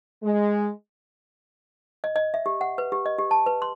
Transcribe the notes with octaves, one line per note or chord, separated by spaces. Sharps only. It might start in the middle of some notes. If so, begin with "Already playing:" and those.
G#3
D#5
D#5
E5
G4
F#5
B4
G4
D#5
G4
A5
B4
C6